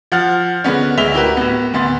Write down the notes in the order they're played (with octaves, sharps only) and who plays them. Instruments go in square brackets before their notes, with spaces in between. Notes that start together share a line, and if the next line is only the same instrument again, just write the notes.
[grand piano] F3 F#5 F6 A6
D3 G#3 B3 C#4
D2 G#3 E5 B6 F7 G7
E4 F#4 G4 A#4 B4
A2 B3
D2 B3 C6 A6